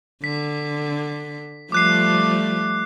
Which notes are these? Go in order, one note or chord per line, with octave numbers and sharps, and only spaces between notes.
D3 B6
F3 G3 A3 D6 F#6 C7